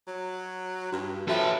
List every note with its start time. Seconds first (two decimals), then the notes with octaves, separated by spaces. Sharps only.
0.07 F#3
0.92 G2 F#4
1.28 F3 F#4 A4 B4 E5 G5